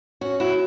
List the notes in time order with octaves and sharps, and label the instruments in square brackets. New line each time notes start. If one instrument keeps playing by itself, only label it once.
[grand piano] C#4 [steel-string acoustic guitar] F#4
[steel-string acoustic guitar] E4 [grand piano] F#4